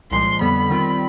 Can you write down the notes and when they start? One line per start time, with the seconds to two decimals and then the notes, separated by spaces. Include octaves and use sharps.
0.11 C2 A#2 F3 G#3 C6
0.41 F2 D3 G3 B3 B5
0.70 D#3 G3 C4 F4